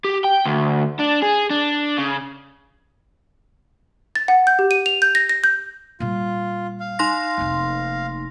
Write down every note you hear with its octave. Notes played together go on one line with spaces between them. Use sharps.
G4
G5
D2
D4
G#4
D4
C#3
A6
F#5
G6
G4
D#7
F7
G6
A#6
A#6
G6
A#2 G3 F4
F5
D#4 C6 A#6
F1 A#3